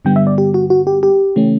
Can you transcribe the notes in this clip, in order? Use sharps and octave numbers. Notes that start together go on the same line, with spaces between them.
G2 D3 G3 B3 G5
E5
D5
G4
F#4
F#4
G4
G4
C#3 E3 A3 C#4